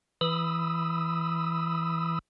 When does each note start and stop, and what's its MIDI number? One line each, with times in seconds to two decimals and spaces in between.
0.21 2.19 52
0.21 2.19 83
0.21 2.19 87
0.21 2.19 88